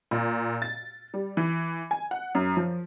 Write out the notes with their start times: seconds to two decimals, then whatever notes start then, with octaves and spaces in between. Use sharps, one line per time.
0.11 A#2
0.62 A6
1.14 G3
1.37 E3
1.91 G#5
2.11 F#5
2.35 F#2
2.57 F3